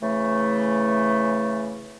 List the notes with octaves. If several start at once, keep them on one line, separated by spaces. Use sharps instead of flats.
C#3 E3 A3